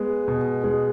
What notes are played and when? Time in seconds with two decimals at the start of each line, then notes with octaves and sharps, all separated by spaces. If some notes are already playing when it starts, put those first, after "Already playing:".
Already playing: G#3 B3
0.28 B2
0.64 G#3